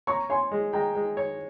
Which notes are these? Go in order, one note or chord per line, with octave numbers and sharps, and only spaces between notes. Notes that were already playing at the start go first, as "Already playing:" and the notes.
C#5 A#5 C#6
C#5 G#5 C6
G#3
G#3 G5 A#5
G#3
C#5